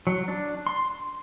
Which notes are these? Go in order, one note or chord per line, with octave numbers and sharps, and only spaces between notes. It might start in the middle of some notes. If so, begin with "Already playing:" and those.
F#3
D4
C6